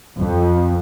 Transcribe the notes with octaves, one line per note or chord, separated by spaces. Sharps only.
F2